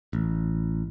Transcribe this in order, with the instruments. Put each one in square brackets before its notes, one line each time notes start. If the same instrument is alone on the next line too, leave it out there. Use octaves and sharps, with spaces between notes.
[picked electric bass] A1